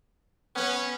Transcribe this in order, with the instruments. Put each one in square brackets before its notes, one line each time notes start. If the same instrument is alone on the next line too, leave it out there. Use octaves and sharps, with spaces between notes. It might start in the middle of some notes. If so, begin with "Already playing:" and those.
[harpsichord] B3 B4 [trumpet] C#4